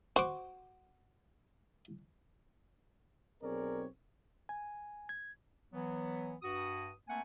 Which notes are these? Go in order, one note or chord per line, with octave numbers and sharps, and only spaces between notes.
F#4 C5 D6
B1 C4 G#4 A#4 C#5 D5
G#5
G#6
E3 F#3 B3
G2 F#4 D#6
A3 A#3 C4 F#5 G#5